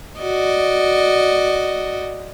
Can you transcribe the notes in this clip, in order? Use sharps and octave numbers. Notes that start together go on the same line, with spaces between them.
F#4 D5 D#5